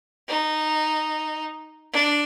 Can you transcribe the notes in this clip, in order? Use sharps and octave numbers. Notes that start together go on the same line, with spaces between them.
D#4
D4